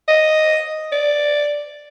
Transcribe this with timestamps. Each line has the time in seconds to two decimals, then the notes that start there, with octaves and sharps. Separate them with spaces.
0.08 D#5
0.92 D5